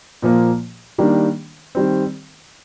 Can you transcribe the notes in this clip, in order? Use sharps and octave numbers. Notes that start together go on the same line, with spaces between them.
A#2 F3 A#3
D#3 G3 A#3 D4
D#3 G3 C4